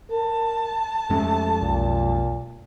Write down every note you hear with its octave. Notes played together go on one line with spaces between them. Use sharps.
A#4 A5
F2 G#3 A3 C#4
B1 A#2